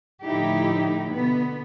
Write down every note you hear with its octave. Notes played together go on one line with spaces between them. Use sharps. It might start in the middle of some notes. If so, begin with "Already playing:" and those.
A2 D3 F3 D#4 E4 G4
B2 D3 B3